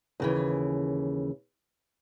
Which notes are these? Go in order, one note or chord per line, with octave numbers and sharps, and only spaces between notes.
D#2 C#3 E3